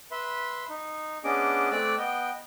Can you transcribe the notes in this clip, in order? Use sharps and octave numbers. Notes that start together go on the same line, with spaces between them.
B4 E5 C6
D#4
B3 C#4 D4 G#4 D#5 D6
A3 C4 D5 D6 E6 F#6
B3 D#5 G5